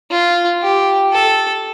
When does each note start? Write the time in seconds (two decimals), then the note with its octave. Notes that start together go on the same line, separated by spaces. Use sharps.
0.11 F4
0.63 G4
1.13 A4